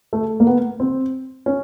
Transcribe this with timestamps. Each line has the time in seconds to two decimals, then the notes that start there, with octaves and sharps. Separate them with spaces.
0.13 A3
0.40 A#3
0.47 B3
0.80 C4
1.46 C#4